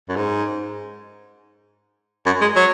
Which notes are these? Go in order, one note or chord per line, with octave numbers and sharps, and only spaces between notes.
F#2
G#2
F#2
G#3
F#3